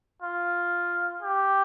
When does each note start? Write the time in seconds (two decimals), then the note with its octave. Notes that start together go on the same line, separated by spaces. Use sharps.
0.22 F4
1.22 G4